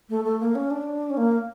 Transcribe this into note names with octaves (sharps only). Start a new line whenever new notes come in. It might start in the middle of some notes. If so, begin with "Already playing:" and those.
A3
A3
A#3
C#4
D4
C#4
A#3